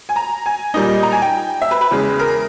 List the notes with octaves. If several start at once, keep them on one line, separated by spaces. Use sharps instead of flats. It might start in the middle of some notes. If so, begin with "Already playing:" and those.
G#5
A#5
G#5
A#2 G3 A#3 D#4 D#5
A#5
G#5
G5
E5
B4
B4
E2 C#3 G#3
A#4